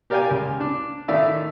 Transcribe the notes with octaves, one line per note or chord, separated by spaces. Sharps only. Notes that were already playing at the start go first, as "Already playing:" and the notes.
G4 A#4 D5 F5 G5 G#5
C#2
D4
A2 D#3 D5 E5 F5 E6